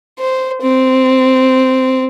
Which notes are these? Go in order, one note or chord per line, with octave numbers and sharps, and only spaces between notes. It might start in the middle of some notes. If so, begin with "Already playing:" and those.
C5
C4